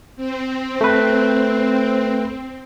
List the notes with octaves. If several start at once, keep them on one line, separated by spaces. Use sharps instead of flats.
C4
A3 B4